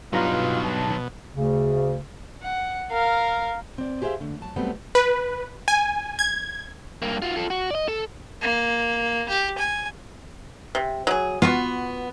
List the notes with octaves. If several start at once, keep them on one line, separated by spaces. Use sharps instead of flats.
G2 B2 F#3 D#4 F4 A#5
A5
D2 C#3
F#5
A#4 F5
C4 D5
G4 G#4 C5 D5 E5 F5
D3 A3
F#3 A5
F#3 G3 A3 B3 C4
B4
G#5
G#6
G2 A#3
F4 F#4
F4 A4
F#4
D5 D#5
A4
A#3
G4
G#5
C3
F#3 G#4
B3 F4 F#4 C#6